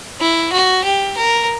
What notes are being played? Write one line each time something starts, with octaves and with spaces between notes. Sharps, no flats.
E4
F#4
G4
A#4